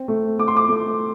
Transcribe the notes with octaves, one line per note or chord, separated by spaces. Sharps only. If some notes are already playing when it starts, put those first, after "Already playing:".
Already playing: C4
A3
A3 D6
C6
D6
A3